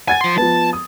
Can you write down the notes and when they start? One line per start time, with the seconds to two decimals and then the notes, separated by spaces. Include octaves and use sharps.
0.08 F#5 G#5 G#6 A6
0.21 F3 C6
0.38 F3 B3 A5
0.73 D#6